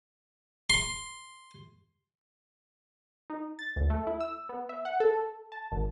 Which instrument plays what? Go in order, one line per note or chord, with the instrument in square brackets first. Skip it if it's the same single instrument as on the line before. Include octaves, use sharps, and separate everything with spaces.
[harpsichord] C6
[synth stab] D#4
A6
D2
A3
E4
E6
B3
E5
F#5
A4
A5
G#1